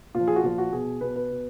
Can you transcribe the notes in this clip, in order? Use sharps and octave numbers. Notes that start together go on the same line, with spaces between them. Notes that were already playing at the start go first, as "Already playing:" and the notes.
A#2 F3 F4
G#4
F#4
A#2 F3 F4
F#4
B2 G#4
B2 B4
B4
B2